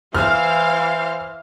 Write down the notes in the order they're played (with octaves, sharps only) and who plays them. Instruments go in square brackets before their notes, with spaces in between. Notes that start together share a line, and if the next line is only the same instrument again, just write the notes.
[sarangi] E3 [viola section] C5 F5 [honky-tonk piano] F6